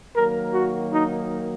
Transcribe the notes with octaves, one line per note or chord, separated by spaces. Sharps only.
D#3 F#3 A#3 A#4
F#4
D#4